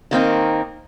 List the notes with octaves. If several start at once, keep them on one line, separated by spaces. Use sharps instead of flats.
D#3 A#3 C4 D#4